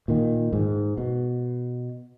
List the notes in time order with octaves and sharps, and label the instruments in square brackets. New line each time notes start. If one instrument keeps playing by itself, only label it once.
[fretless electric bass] A#2 D#3
G#2
B2